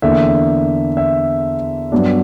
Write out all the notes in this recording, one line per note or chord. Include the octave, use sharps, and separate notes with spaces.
E2 D3 A#3 D4 E5
E5
G2 F#3 B3 D4